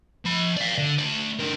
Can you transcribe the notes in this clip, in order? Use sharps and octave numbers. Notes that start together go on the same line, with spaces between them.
F3 B5
D5 F5
D3
A3 D5
D3 A#4